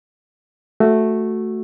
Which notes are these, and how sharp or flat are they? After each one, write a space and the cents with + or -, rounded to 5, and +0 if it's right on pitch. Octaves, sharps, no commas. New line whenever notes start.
A3 +0 F#4 +0